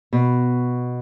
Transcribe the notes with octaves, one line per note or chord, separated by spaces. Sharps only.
B2